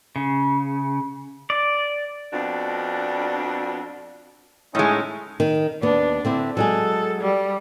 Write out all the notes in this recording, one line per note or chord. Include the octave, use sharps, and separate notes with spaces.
C#3
D5
F2 B2 D4
A2 G#3 C#4 D#4
D#3
D#2 B3 D4
D3 C4 E4
F#3 G#3 G#4 A4
G3